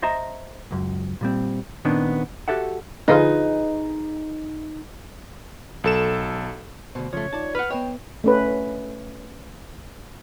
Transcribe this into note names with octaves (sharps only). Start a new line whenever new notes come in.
C5 D#5 E5 A5 A#5
C#2 F#2
A#2 G3 C4
A#2 D#3 B3 C4 D4
F#4 G4 A4 E5 F#5
D3 F3 D#4 F4 G#4 B4 D#5
B1 A4 E7
D2 B2 C5
C#3 F3 A3 C#5
D#4 F4 D5 A5
B4 F#5 F6
B3 B4 C#5 D#5 G5
A3 C#4 B4